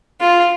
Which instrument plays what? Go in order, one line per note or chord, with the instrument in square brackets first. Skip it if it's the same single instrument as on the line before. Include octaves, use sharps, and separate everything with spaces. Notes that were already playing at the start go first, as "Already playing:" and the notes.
[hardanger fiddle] F4